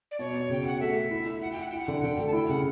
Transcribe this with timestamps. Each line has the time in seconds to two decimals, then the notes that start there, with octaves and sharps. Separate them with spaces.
0.11 D5
0.19 B2 C#5
0.34 B2
0.49 C#3 G5
0.64 F#4 F#5
0.80 A3 E5
0.95 A3
1.11 E4
1.26 E4
1.41 E4 F#5
1.51 G5
1.57 E4 F#5
1.69 E4 G5
1.79 F#5
1.88 D3
2.03 D3 G5
2.19 A3
2.27 A5
2.33 E4 G5
2.49 C#3 F#5